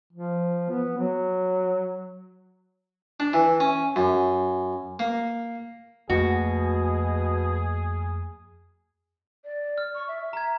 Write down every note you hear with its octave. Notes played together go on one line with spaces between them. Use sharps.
F3
B3
F#3
D4
E3
C#4
F#2
A#3
F2 B2 A3 A#3 F#4 G#4
D5
F6
C#6
E5
A#5 G#6